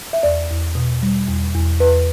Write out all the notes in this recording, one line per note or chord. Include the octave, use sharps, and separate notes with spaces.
E5
E2 D5
E2
B2
G3
E2
E2
E2 B4